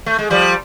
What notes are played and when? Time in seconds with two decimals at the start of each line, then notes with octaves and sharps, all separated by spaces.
0.06 A3
0.19 G#3
0.30 F3 G3